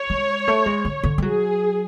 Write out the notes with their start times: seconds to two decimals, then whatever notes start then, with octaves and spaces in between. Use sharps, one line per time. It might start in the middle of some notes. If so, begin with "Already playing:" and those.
Already playing: C#5
0.10 G#3
0.48 A3
0.66 G#3
0.85 D3
1.03 D3
1.18 G#3
1.22 F#3 G#4